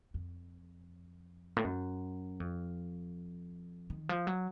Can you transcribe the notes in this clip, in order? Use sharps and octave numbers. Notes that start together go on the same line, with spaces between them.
F2
A2
F#2
F2
D#3
F3
F#3